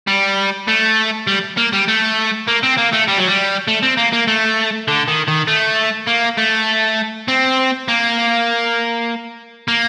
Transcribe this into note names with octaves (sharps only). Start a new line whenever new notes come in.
G3
A3
G3
A#3
G3
A3
A#3
C4
A#3
A3
G3
F#3
G3
A3
C4
A#3
A#3
A3
D3
D#3
D#3
A3
A#3
A3
C4
A#3
A#3